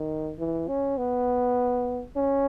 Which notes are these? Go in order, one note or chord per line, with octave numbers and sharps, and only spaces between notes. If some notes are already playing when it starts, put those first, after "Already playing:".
Already playing: D#3
E3
C#4
B3
C#4